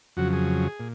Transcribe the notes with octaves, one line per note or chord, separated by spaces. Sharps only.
F2 C#3 F#3 F#4
G#4
A#2